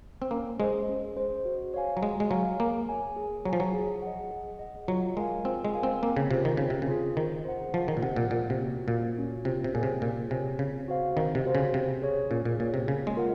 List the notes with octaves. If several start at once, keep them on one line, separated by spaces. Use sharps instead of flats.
C4
A#3 C#4
G#3 G#4 C5 D#5
C#4
G#4 C5 D#5
F#4
C#5 F5 G#5
F#3
G#3 F#4
G#3
F#3 C#5 F5 G#5
A#3 G#4
C#5 G#5
G#4
F3 F#3 C#5 G#5
F#3
G#4
D#5 F#5
G#4
D#5 F#5
F#3 F4
G#3 A#4 F5 G#5
C4 F4
G#3
A#4 F5 G#5
C4
A#3 C4
C#3
C3 F4 G#4 C5
D#3
C#3 C4
C3
C#3
F4 G#4 C5
D#3 G#4
C5 F#5
F3 G#4
D#3
A#2
C3 C5 F#5
A#2
A#2 A#3
C3
C#4 F#4
A#2 A#3
C#4 F#4
C3 F4
C3
A#2 G#4 C#5 G#5
C3
A#2 F4
C3 G#4 C#5 G#5
C#3 C4
F#4 C5 F5
D#3 C4
C3
F#4 C5 F5
C#3
C3 C#4
G#4 C#5
A#2 C#4
A#2
A#2 G#4 C#5
C3
C#3 A#3
G#3
F4 A#4 D#5 F#5